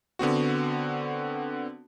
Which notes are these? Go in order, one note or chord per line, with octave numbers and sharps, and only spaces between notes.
D3 B3 C4 F#4